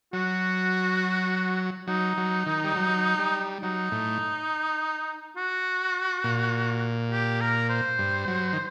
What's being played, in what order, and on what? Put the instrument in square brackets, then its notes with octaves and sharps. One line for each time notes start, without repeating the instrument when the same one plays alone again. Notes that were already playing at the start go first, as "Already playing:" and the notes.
[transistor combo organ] F#3 [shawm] F#4
[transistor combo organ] F#3 [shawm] D#4
[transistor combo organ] F#3
D#3
G3
F#3
G3
[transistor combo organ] F#3 [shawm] D#4
[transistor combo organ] A2
[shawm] F#4
[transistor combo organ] A#2
[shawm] G4
A#4
C5
[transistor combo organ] G2
F#3
D#3